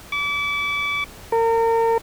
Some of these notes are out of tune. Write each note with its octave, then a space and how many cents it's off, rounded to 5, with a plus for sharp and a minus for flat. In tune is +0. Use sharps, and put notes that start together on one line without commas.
D6 -35
A#4 -35